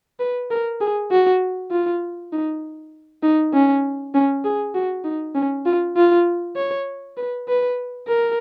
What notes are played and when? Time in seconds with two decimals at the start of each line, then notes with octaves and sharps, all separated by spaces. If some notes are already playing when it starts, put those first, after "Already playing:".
0.20 B4
0.51 A#4
0.81 G#4
1.11 F#4
1.72 F4
2.33 D#4
3.23 D#4
3.54 C#4
4.14 C#4
4.45 G#4
4.75 F#4
5.05 D#4
5.35 C#4
5.66 F4
5.97 F4
6.56 C#5
7.17 B4
7.48 B4
8.08 A#4